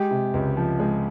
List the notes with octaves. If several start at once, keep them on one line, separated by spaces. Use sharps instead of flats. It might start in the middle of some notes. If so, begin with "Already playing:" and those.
Already playing: G#3 G4
C3
C#2
F3
G#3